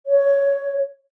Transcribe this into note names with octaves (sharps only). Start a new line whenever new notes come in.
C#5